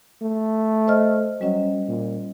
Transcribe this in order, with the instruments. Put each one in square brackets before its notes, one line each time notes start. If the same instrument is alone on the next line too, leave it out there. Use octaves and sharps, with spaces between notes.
[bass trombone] A3
[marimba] C5 D#5 F6
[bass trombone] F#3 [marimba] G3 C#4 D#5
[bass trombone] A#2